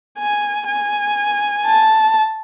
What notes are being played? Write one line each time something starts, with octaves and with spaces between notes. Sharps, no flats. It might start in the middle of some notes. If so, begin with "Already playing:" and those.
G#5
G#5
A5